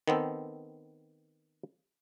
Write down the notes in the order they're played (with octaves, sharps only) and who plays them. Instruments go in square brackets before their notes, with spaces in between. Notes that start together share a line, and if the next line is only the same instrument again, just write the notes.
[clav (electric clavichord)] D#3 B3 C4 A4